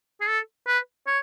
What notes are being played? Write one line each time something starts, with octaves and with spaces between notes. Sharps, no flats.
G#4
A4
B4
C#5